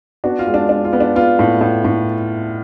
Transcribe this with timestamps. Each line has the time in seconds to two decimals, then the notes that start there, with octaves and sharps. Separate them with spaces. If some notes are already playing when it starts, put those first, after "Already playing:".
0.24 B3 D4 F#4
0.39 F4
0.47 G#3
0.54 D4
0.69 G#3 D4
0.84 F4
0.93 B3
1.00 D4
1.16 B3 F4
1.39 A2
1.61 A2
1.85 A2